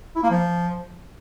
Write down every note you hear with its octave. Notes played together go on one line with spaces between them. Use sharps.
E4
A#3
F3